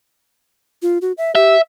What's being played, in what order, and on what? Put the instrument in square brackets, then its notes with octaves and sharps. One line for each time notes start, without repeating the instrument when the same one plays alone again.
[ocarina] F4
F#4
E5
[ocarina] G4 [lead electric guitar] E5